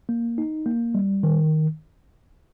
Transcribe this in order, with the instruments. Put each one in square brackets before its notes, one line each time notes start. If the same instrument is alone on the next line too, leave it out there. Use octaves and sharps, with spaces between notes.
[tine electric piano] A#3
D#4
A#3
G3
D#3